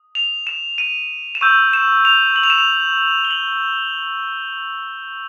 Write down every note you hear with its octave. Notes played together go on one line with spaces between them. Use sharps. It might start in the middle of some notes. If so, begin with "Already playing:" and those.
Already playing: D#6
F7
E7
D#7
E7
C#6 E6 G6 D#7
E7
F7
F#7
F7
E7
F7
G7
F#7